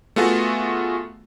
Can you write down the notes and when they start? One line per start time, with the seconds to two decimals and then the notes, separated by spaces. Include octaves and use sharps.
0.16 A3 B3 F4 F#4 G#4 A4